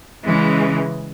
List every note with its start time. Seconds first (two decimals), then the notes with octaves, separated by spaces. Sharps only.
0.24 C#3 E3 G#3